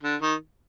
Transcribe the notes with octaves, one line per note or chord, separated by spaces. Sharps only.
D3
D#3